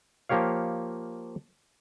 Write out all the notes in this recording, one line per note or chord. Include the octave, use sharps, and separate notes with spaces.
F3 A#3 G4 C#5 F5